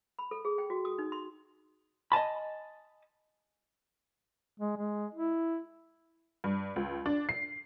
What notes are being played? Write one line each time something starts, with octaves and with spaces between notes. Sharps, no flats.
B5
A4
G#4
G5
F#4
D#6
D#4
C6
D#5 G#5 A5 B5
G#3
G#3
E4
G2
C#2
D4
C7